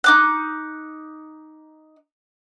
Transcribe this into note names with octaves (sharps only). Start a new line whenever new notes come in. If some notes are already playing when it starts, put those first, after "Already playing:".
D#4 D6 F#6